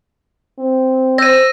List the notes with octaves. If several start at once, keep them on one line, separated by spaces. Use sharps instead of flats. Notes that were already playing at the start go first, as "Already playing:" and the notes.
C4
C5 E6 A#6 D#7